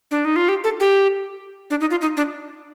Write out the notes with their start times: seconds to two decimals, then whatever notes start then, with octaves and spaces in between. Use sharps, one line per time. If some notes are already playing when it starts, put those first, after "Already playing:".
0.11 D4
0.25 D#4
0.36 F4
0.49 G4
0.64 A4
0.80 G4
1.70 D4
1.81 D#4
1.91 F4
2.01 D#4
2.17 D4